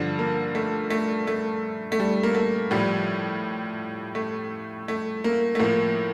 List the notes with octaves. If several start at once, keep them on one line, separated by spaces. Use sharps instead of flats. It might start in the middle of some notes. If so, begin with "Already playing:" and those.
Already playing: G2 D3 F3 D4
A#3
A3
A3
A3
A3
G3
A#3
A3
A2 F3 G3
A3
A3
A#3
A3
A2 F3 A#3